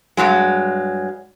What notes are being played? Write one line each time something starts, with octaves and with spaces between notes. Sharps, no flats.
G2 C#3 F#3 G#3